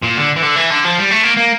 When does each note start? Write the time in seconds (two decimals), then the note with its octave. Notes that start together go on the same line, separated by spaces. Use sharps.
0.02 A#2
0.17 D3
0.36 E3
0.42 D3
0.56 E3
0.71 D3
0.84 F3
0.97 G3
1.10 A3
1.23 A#3
1.37 A#3